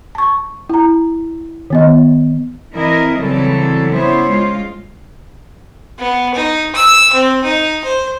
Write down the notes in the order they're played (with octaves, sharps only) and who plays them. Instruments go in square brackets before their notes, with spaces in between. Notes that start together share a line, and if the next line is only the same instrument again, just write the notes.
[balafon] A5 C#6
E4 A#5
D#3 B3 D#5
[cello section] E3 C4 E4 A#4 D#5
C#3 E3 F#3 G3 C4 A4
B3 C#4 E4 C5 C#5
G#3 F4
[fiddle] B3
D#4
E6
C4
D#4
C5